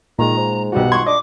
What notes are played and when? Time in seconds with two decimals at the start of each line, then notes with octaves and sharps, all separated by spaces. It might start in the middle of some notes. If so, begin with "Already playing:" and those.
0.19 A#2 D#3 G#3 A#5
0.37 G#2
0.72 B1 G3 F#4 F#5
0.92 C6 C#6 G#6
1.06 D4 D#5 D6